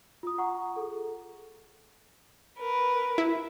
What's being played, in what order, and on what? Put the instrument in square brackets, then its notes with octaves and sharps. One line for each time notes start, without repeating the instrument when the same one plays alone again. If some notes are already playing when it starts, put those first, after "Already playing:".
[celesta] F4 D#6
F4 F#5 A#5 C#6
G#4 A4
[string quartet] A#4 B4
[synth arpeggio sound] E4